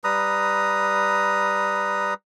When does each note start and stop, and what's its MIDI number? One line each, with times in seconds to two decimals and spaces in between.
0.04 2.14 55
0.04 2.14 71
0.04 2.14 82
0.04 2.14 87